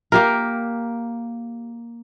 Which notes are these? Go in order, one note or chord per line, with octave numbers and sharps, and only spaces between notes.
A#3 G4 A#4